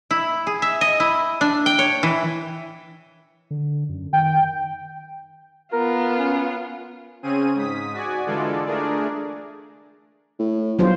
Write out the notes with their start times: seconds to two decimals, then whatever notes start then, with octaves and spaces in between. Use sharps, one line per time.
0.11 E4
0.47 G#4
0.62 E5
0.81 D#5
1.00 E4
1.41 D4
1.66 G5
1.79 C#5
2.03 E3
3.51 D3
3.89 F#2
4.13 D#3 G5
5.73 B3 F4 A#4
6.18 C#4
7.23 C#3 C4 C#4 G#4 D#7
7.55 G#2 D#6 B6
7.93 F#4 D5 G#5
8.26 D3 E3 G#3 F4 A4 D5
8.66 A3 D4 G#4 A#4 D5
10.39 A2
10.79 G1 F#3 F4 C5